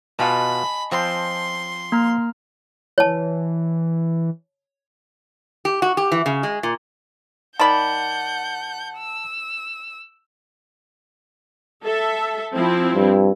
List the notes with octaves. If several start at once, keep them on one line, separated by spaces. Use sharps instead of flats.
B2 F4 D#5 F#5 G#5 A5 B5
F3 C4 C6
A#3 A#5 F6
E3 C#5 A5
G4
F#4
G4
E3
C#3
G#3
A#2
D#3 D5 F#5 A5 B5 G6
E6
A4 E5
F3 C4 E4
G2